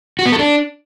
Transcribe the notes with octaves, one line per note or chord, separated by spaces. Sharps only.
F#4
B3
A4
D4